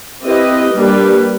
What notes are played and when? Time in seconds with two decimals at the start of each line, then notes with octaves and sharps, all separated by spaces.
0.22 C4 E4 G4 B4 D#5
0.75 G3 A#3 D4 G4 B4